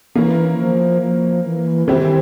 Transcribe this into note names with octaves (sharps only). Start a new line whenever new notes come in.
E3 A#3 C#4 E4
F3
F3
E3
D#3 E3 G3 C4 E4 G4